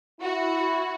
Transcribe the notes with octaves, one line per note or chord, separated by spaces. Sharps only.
E4 F#4